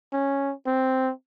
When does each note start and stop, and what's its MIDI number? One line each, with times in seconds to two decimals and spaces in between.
0.13 0.54 61
0.67 1.12 60